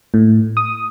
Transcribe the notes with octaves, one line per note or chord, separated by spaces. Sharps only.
A2
D#6